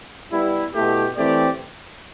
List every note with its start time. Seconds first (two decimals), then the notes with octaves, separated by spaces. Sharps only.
0.31 G3 B3 E4
0.74 B2 A3 E4 G4
1.16 E3 A3 C4 G4 D5